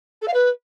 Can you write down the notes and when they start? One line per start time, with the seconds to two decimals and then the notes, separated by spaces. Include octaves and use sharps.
0.21 A4
0.27 F5
0.33 B4